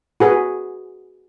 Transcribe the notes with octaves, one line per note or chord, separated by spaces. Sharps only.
F#4 G#4 B4